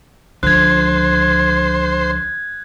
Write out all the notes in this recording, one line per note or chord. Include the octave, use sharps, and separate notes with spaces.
C#2 D3 F3 C5 F#6 G#6